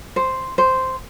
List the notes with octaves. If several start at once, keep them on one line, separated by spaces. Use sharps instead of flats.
C5
C5